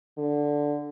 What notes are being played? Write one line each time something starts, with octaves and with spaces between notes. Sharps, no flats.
D3